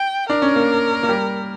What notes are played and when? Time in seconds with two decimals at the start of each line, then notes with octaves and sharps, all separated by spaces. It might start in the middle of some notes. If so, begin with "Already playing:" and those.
Already playing: G5
0.29 D4 A#4
0.42 C#4
0.56 A#3
1.03 A#3
1.09 G3